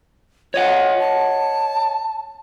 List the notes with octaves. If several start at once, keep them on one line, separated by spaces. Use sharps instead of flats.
F4 C#5 D#5 F#5
A5